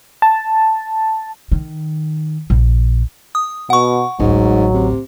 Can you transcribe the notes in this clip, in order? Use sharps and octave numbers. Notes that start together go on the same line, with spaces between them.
A5
D#3
A#1
D#6
B2 F#5 C#6
A1 D2 G#2 F#3
C3